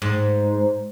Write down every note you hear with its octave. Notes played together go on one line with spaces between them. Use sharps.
G#2